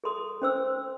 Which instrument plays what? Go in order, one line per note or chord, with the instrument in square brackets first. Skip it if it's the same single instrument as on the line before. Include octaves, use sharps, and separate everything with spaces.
[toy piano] G#4 A4 C6 D#6
C#4 C5 E6